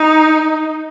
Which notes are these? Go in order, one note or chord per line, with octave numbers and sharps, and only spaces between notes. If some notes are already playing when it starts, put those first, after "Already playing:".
Already playing: D#4